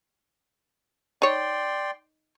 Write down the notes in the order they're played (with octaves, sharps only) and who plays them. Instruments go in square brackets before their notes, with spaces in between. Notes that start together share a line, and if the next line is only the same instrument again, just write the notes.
[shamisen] D#4 C#5 [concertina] D5 G5 C6